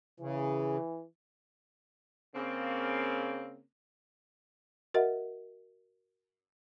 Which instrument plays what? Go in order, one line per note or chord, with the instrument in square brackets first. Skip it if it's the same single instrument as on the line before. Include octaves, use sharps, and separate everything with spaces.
[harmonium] C#3 [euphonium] E3
[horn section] C#3 A#3 C4
[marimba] F#4 A#4 D#5 E5 F#5